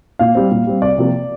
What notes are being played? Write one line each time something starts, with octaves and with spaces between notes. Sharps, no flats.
A#2 F5
G3 C4
A#2
G3 C4
C2 D5
C3 F3 A#3